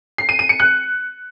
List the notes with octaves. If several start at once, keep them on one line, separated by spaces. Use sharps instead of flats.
C7
D#7
D#7
C#7
F#6